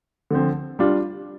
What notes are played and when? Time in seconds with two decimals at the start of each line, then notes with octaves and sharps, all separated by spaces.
0.31 D3 F3 C4
0.79 G3 D4 F4